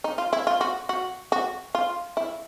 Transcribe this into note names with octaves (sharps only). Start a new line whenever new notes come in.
D#4
F4
E4
F4
F#4
F#4
F#4
F4
E4